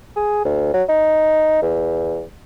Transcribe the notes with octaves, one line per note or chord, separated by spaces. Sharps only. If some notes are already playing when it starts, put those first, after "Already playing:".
G#4
D2
F#3
D#4
E2